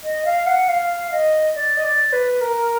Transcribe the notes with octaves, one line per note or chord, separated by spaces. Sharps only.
D#5
F5
F#5
F5
D#5
D5
D#5
D5
B4
A#4